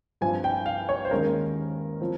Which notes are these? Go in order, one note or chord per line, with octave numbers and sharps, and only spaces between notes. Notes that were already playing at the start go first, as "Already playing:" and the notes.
G2 F3 C4 G#5
G5
F5
C#5
C5
D#2 D#3 G#3 C#4 A#4
F3 C4